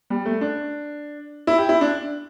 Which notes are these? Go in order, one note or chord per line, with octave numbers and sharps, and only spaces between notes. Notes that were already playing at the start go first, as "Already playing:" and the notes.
G3
A3
D4
E4
G4
E4
D4